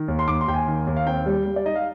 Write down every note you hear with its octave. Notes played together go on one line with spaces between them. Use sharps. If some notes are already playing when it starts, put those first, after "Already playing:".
Already playing: D#3
D#2
C6
D#2 D6
C6
D#2 G5
G#5
D#3
D#2
F5
C4 G5
G3
G3
D5
D#4 D#5
F5